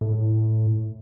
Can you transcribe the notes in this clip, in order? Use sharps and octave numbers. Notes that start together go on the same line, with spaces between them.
A2